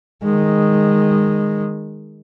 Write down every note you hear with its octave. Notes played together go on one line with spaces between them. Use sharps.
D#3 G#3